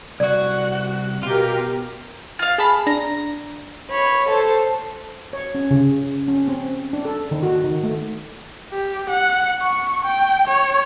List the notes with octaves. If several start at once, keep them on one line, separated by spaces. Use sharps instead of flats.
C2 F#4 D5
B2 F4 G4 A#4
F4 F5
G#4 A5 B5
D4 A#5
C#5 B5
A4 C5
C#5
C#4
C#3
C#4
C4
D4
A4
D#3
F#4
D#3
A3
G4
F#5
C#6
G5
C#5